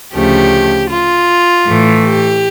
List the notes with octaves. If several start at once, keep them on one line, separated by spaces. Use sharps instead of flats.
D2 C#3 F3 A3 G4
F4
A2 E3 A3
G4